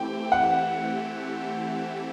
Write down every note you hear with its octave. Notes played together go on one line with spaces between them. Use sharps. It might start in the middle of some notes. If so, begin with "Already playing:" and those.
Already playing: E3 A3 C4 E4 G4 G5
F#5